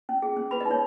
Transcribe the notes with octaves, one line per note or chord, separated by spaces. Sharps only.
C#4
G#4
C#4
B4 B5
D#5
D#4
C#5